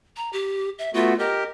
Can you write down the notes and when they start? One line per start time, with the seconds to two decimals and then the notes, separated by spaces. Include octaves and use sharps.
0.16 A#5
0.33 G4
0.79 E5
0.94 A3 B3 F4 F#4
1.19 G4 A#4 D#5